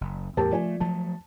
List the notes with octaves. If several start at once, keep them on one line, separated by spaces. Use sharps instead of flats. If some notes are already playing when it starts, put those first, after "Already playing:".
F#1
E2 A2 G4 A#4 A5
F3 A3 D5 G#5
F3 F#3 A3 A5